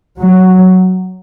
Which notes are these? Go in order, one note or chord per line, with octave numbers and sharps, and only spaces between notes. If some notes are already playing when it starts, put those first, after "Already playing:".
F#3